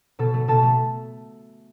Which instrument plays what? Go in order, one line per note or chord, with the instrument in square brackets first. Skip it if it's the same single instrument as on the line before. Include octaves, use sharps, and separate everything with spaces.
[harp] B2 A4
A3
B2 A4 A5
A3